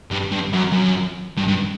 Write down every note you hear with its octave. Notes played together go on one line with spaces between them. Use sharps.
G2
G2
F#2
F#2
G2
G2